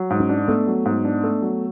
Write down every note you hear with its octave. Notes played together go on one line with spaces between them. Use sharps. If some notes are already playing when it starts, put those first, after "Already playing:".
Already playing: F#3
G#2
C#4
D4
A3 B3
F#3
G#2
D4
A3
F#3